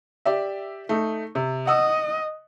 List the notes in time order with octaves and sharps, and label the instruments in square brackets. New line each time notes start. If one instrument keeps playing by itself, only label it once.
[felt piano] G4 D5 E5
A3 D#4
C3
[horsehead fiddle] D#5 [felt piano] F#5 D#6 E6